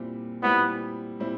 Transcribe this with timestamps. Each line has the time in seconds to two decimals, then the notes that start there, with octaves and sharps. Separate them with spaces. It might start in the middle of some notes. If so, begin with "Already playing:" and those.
Already playing: A#2 G3 C4 E4
0.43 A#2 G3 B3 C4 E4
1.20 A#2 G3 C4 E4